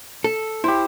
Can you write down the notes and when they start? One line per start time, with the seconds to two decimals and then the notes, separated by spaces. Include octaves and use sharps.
0.24 A4
0.64 E4 G4 C5